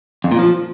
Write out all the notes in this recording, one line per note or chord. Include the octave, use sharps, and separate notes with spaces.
F2
A#2
F3